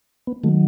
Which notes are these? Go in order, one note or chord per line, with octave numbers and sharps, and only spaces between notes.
B3
D#3 F#3 A3